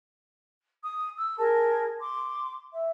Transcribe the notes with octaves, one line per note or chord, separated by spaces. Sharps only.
D#6
E6
G#4 A#4 A5
C6 D6
E5